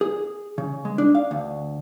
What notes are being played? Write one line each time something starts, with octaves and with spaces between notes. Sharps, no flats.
G#4
C#3
G#3
D4
F5
D2